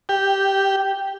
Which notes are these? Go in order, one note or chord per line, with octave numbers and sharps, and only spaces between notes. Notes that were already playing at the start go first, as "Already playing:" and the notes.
G4